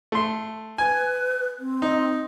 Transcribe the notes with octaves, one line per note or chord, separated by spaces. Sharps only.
A3 C6
B4 G#5
C4
D#4